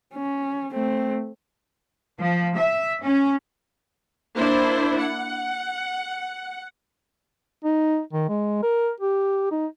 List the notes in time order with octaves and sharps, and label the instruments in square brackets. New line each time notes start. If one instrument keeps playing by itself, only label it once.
[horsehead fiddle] C#4
A3 C4
[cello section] F3
E5
C#4
[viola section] A#3 D4 E4 C5
F#5
[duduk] D#4
D#3
G#3
A#4
G4
D#4